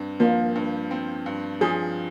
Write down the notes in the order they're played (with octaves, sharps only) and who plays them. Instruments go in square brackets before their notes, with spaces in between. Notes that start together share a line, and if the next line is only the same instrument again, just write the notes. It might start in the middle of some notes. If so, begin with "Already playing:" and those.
Already playing: [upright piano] G2 C4
[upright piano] F3 [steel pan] A#3
[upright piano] G2
C4
G2
[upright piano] F3 [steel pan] G#4